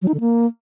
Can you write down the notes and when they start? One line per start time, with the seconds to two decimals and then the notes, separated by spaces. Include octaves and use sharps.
0.02 F#3
0.08 D#4
0.14 D3
0.20 A#3